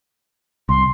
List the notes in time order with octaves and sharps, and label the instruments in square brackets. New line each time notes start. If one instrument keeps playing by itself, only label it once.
[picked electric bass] C2 [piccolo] C6